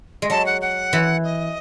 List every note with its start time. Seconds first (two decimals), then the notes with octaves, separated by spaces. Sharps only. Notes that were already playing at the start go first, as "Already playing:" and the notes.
0.22 G#3
0.30 F#3 A5
0.46 F#5
0.61 F#5
0.93 E3
1.24 D#5